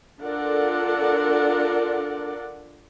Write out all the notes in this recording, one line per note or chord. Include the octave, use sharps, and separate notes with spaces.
D4 F4 A4 A#4 D5 F#5